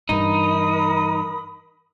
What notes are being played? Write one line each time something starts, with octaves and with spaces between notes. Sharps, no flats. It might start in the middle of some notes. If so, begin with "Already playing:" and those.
G2 E3 D#4 A#4 B5 D#6